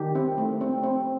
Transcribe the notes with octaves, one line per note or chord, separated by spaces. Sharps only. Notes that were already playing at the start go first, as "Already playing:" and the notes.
Already playing: D#3 G4
C4
A3
C4
C4